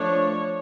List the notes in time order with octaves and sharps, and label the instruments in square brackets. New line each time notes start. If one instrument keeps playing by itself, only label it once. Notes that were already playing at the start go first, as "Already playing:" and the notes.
Already playing: [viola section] F3 A3 D4 C#5